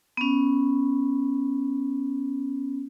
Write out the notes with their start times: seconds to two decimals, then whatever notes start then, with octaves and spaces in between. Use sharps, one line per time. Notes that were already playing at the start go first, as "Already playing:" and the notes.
0.17 B3 C#4